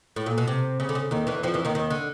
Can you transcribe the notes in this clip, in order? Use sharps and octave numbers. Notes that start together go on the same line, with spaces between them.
A2
A#2
B2
C3
C#3
D3
C#3
D#2 D#3
E2 E3
F2 F3
E2 E3
D#2 D#3
D#2 D#3
D3